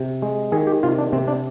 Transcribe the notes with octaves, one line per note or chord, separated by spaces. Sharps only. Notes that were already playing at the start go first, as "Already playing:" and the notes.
Already playing: C3
G#3
D#3 G#4
G4
C3 F4
D4
C3 C4
D4